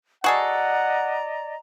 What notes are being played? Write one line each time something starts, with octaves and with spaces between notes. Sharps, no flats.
F#4 G#4 A4 D5 D#5 F#5 A#5